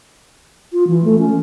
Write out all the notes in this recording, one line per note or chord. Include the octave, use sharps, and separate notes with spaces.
F4
E3
A3
C#4